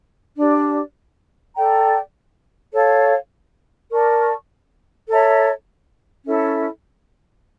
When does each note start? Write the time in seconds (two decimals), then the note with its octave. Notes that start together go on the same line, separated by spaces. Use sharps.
0.37 D4 G4 D5
1.55 A4 D5 G5 A#5
2.73 A4 C#5 F5
3.90 A#4 D5 A5 C#6
5.08 A4 C#5 E5 A#5
6.26 C#4 E4 A4 E5